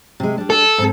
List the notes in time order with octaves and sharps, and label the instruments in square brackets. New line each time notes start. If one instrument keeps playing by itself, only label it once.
[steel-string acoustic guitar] C3 G#3
G3 D4
[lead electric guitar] A4
[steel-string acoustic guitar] G#2 C4